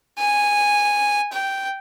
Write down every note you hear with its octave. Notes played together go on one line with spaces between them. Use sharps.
G#5
G5